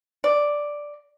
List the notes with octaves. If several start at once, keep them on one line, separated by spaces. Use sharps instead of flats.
D5